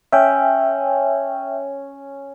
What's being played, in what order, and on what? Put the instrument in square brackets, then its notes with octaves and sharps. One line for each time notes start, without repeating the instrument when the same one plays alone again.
[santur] C#4 [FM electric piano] E5 G5